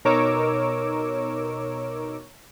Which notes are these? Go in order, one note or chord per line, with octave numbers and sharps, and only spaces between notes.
B2 D#4 A#4 C#5 D6 E6